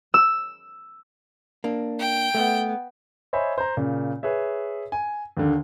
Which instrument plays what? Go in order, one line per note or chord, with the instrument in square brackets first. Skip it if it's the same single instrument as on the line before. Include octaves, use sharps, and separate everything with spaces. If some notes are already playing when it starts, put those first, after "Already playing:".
[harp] E6
[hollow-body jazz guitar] A#3 D4
[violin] G5
[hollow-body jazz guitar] A3 [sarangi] B3
[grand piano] C5 C#5 D#5 E5 G#5 B5
C5 A#5
A#2 C#3
G#4 B4 C#5 E5
G#5
D#2 D3